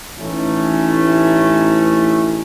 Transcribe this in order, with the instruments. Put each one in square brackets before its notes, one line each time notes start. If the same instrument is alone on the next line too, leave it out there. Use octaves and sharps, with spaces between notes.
[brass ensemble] A1 E3 A3 C#4 D#4 E4